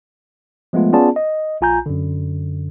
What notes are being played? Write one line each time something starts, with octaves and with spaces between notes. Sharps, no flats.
F3 G#3 A3 B3 F4
B3 C#4 F4 G#4 D5 A5
D#5
A#1 F4 G#5 A#5 G6
F#2 D3